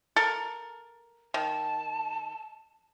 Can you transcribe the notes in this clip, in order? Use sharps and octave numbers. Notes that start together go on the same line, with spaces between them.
A4 A#4
D#3 A5